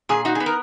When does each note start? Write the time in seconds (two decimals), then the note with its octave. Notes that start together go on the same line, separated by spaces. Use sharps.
0.09 A#2 G#4
0.25 D#4 F#4
0.35 G#4
0.40 B3
0.46 A#4